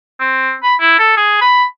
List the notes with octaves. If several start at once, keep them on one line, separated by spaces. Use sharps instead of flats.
C4
B5
E4
A4
G#4
B5